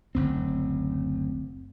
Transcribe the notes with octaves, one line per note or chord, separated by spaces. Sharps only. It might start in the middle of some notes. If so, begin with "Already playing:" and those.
F#1 D2 C4